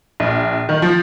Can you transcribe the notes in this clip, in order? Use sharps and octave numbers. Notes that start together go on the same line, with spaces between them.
A#1
D#3
F3